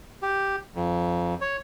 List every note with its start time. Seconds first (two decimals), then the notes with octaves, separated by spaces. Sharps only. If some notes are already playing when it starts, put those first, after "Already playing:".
0.22 G4
0.75 F2
1.41 C#5